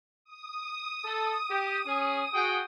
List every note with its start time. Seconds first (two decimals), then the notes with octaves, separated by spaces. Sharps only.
0.24 D#6
1.05 A4
1.50 G4
1.86 C#4 G#4
2.33 F#4 G#4 G5